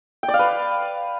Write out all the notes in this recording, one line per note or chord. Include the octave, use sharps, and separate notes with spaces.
G5
D5
F5
B4